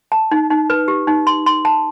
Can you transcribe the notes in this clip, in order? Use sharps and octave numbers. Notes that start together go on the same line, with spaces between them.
A5
D#4
D#4
B4
G4
D#4
C6
C6
A5